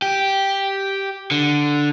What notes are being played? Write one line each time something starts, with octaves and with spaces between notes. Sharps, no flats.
G4
D3